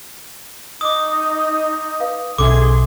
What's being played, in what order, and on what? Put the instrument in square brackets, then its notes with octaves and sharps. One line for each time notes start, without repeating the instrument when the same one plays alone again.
[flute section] D#4 [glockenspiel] D6 D#6
[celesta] B4 F5
[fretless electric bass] B1 B2 C#4 [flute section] G#4 C6 [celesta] A4 E5 [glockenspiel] D6